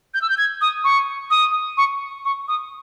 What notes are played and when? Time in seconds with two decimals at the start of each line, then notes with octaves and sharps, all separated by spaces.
0.14 G6
0.22 E6
0.30 G6
0.38 G#6
0.61 D#6
0.84 C#6
1.31 D#6
1.77 C#6
2.25 C#6
2.48 D#6